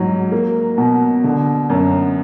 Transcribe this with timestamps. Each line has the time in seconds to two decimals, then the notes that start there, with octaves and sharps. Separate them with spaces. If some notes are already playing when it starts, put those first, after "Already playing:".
Already playing: G#2 F#3
0.32 A#3
0.78 B2
1.24 D3
1.70 F#2